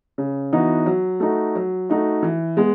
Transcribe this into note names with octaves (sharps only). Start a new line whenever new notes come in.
C#3
E3 B3 D#4 F#4
F#3
A3 D#4 F#4
F#3
A3 D#4 F#4
E3
G#3 B3